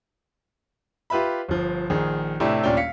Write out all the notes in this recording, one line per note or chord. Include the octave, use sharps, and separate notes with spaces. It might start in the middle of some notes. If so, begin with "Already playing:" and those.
F4 G4 B4 E5 B5
G1 F3
A#1 D#3 G#4
A2 C3 A3 D4 E4 G4
D#1 A#2 C#4 D4 D5 G5
F5 B6 C#7